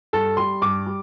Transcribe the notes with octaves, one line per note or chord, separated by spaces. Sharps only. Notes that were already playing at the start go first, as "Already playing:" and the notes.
G2 A4
G3 C6
G2 D6
G3